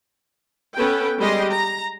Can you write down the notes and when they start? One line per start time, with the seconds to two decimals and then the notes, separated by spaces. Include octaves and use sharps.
0.74 B3 C#4 A4 B4 G5
1.18 G3 G#3 G4 D#5 C6
1.50 A#5